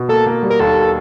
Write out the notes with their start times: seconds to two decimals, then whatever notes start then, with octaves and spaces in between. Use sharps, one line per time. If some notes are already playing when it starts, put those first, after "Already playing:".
Already playing: B2
0.09 A#3 A4
0.26 A#3
0.43 G3
0.50 A#4
0.60 D#2 A4